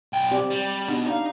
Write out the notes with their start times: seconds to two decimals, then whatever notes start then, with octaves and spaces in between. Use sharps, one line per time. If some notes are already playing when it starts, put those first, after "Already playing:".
0.13 B1 G5
0.31 C4 G4 D5
0.50 G3
0.88 B3 D4 D#4 F#4
1.06 D#4 D5 F5